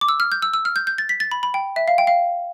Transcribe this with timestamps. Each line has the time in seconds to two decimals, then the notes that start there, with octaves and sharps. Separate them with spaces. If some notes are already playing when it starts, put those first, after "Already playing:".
0.01 D6
0.09 E6
0.20 F6
0.32 G6
0.42 E6
0.54 E6
0.65 F6
0.76 G6
0.87 G6
0.98 A6
1.09 B6
1.20 A6
1.32 B5
1.43 B5
1.54 G5
1.76 E5
1.88 F5
1.98 G5
2.07 F5